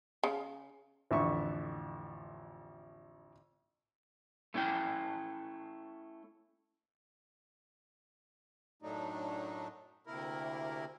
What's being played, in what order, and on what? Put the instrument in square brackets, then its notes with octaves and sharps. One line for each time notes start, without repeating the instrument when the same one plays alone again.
[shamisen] C#3
[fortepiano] A1 F2 D3 E5 C#6
[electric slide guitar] A3 C#4 E4 G5
[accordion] F#2 A2 F#3 A3 D4 D#4
D2 C3 A#3 E4 A#4